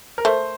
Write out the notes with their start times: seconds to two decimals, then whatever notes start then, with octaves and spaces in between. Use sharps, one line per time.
0.18 A#4
0.25 A3 C5